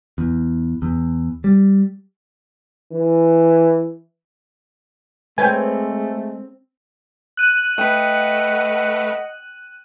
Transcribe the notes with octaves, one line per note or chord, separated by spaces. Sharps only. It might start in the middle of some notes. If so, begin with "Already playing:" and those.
E2
E2
G3
E3
G#3 A3 C4 B4 C#5 G5 G#5
F#6 D#7
A3 B4 D#5 F#5 G5